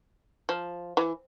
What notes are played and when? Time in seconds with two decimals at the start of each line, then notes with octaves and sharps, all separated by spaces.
0.49 F3
0.97 E3